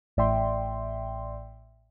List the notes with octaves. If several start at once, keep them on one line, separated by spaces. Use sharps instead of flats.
A1 A2 D5 E5 G5 C6